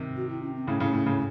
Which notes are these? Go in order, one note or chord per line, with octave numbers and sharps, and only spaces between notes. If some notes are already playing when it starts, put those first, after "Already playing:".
Already playing: C3 D#3
F#4
E4
C#4
C4
A2 C#3 C#4
A2 C#3
A2
A2 C#3